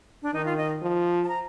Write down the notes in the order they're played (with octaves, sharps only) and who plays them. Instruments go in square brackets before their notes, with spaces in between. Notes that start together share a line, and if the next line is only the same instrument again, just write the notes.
[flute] D4
[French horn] D#3 [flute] D#4
[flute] F4
D#5
[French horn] F3
[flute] A5
A#5